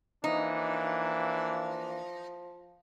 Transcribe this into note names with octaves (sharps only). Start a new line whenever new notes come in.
E3 F3 A#3 D4 D#4